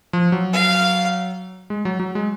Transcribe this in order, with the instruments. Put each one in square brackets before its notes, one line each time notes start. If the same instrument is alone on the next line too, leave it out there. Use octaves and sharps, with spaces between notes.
[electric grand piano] F3
F#3
[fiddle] F5
[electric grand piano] G#3
F#3
F#3
G#3